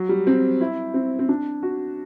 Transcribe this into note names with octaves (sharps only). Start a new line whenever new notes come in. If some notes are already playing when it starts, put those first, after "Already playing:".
Already playing: F#3
G3
C4
E4
C4
C4
D4
F#4